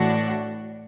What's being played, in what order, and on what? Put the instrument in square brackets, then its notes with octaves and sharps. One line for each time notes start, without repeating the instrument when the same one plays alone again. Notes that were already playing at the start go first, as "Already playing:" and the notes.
Already playing: [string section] A2 E3 A3 D4 F#4